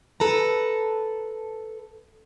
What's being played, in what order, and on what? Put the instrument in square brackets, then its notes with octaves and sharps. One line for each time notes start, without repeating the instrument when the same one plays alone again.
[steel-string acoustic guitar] A4 B4 A#5